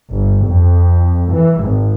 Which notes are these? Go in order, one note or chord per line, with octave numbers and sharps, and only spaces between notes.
G1
F2
E3
G#1